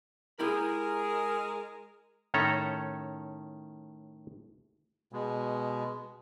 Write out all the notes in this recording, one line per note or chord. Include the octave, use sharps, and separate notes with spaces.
G#3 E4 G4 G#4 A#4 B5
A2 D#3 C#4 A4 C#5 A#5
B2 G#3